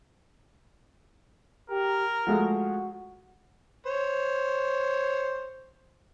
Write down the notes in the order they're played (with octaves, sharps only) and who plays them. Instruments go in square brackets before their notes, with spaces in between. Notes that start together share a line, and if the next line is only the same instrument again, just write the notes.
[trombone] G4 [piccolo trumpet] A#4
[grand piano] F3 G#3 A3 [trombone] F#4
[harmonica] C5 C#5